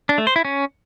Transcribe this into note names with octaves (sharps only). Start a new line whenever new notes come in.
D4
A3
C5
E4
C#4